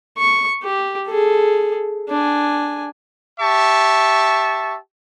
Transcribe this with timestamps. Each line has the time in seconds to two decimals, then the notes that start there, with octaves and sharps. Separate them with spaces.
0.18 C#6
0.63 G4
1.08 G#4 A4
2.10 D4 G#5
3.40 G4 E5 A5 C#6